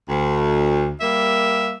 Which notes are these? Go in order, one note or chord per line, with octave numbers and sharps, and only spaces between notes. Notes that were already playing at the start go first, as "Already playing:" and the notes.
D2
G3 A#3 E5